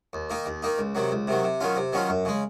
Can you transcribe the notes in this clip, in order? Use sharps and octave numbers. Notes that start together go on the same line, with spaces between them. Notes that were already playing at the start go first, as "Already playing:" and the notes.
D#2
D#3 A#3 D#4
D#2
D#3 A#3 D#4
C#2
C3 D#3 F#3
C#2
C3 D#3 F#3
C3
D#3 F#3 C#4 F4
C3
D#3 F#3 C#4 F4
F#2
C#3 G#3